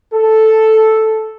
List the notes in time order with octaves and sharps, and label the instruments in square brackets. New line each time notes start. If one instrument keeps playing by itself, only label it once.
[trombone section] A4